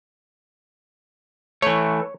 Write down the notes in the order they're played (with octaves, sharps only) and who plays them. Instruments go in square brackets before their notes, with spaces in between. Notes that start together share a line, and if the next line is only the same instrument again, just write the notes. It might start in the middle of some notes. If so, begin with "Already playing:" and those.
[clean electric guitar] E3 A3 [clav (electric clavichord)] C#5